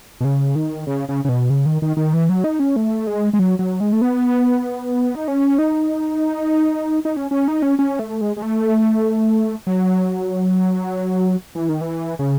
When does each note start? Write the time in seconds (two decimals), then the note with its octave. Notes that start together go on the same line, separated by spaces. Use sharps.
0.21 B2
0.25 C#3
0.55 D#3
0.87 C#3
1.09 C#3
1.25 C#3
1.29 B2
1.50 C#3
1.66 D#3
1.82 D#3
1.97 D#3
2.13 E3
2.29 F#3
2.44 D#4
2.59 C#4
2.76 A3
3.07 G#3
3.33 G#3
3.39 F#3
3.59 F#3
3.80 G#3
3.93 A3
4.01 B3
5.15 D#4
5.28 C#4
5.58 D#4
7.05 D#4
7.16 C#4
7.31 C#4
7.48 D#4
7.62 C#4
7.79 C#4
7.99 A3
8.21 G#3
8.37 G#3
8.42 A3
9.67 F#3
11.55 E3
11.69 D#3
11.81 E3
12.19 C#3